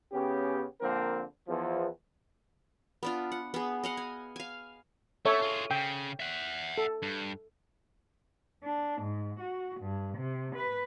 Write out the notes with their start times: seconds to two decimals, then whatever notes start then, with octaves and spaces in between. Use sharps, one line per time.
0.12 C#3 B3 C#4 G4
0.81 D3 F3 A#3 C4 A#4
1.47 E2 F3
3.03 B3 D4 F4
3.32 F#5
3.54 B3 G#4
3.84 D#5 F5 F#5
3.97 G#5
4.36 F5 G#5
5.25 A3 A4 C#5 E5
5.42 F4 G#4
5.71 C#3 G5
6.20 E5 F#5
6.78 A4
7.02 G2
8.64 D4
9.01 G#2
9.38 F#4
9.80 G2
10.17 C3
10.56 B4